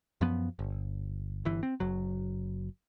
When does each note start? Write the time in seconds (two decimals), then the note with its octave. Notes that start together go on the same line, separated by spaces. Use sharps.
0.21 F#2 F3 B3
0.59 G1
1.45 G1 E3
1.63 C4
1.80 F#1 F#3